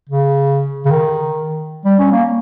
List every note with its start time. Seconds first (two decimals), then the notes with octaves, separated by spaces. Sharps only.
0.09 C#3
0.86 C#3
0.91 D#3
1.85 G3
1.99 C#4
2.12 A#3